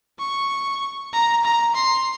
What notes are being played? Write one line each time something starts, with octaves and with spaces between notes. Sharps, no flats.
C#6
A#5
A#5
C6